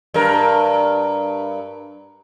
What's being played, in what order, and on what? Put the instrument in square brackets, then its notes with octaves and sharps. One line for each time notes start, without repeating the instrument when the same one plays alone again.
[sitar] G2 A#4